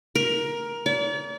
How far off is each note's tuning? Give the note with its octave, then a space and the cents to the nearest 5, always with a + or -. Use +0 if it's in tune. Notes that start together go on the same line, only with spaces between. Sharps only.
A#4 +15
D5 -40